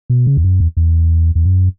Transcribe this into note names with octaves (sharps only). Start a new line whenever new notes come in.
B2
C#3
E2
F#2
E2
E2
E2
F#2